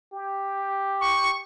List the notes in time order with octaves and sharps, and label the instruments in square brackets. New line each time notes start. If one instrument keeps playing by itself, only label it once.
[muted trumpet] G4
[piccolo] C#6